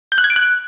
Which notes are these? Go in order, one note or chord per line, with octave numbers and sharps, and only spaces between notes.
G6
F#6
G#6
D7
F#6